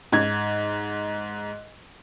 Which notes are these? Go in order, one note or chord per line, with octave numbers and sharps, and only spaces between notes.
G#2 G#6